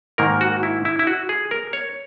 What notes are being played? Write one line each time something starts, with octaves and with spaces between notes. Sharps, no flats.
G#2 D#3 A#3 A#4
F#4
E4
E4
E4
F#4
G#4
A#4
C#5